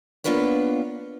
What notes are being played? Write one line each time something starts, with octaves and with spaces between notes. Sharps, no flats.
A#3 B3 D4 F4 B4 C#5